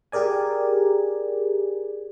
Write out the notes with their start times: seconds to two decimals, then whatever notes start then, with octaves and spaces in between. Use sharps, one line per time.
0.12 G4 G#4 A#4 D5 G#5